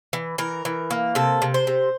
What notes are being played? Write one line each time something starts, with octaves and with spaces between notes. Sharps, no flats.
E3
E3 A#4
E3
A#3
C3 A4
C3
C5
C3